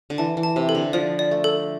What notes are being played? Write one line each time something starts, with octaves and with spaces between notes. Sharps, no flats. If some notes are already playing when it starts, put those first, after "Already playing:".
D3
E3 A5
E3
A5
C3
A4
D3
F3 D5
D5
A3
A4